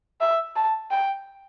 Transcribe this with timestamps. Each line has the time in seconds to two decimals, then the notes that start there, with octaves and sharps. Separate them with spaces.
0.21 E5
0.56 A5
0.91 G5